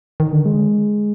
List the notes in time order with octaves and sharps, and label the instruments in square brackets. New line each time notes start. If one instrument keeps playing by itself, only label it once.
[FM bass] D#3
D3
G#3